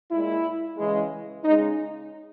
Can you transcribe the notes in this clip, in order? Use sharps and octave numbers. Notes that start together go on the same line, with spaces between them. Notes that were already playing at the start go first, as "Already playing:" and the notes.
A#2 G#3 E4
C#3 E3 G#3
C#3 G#3 D#4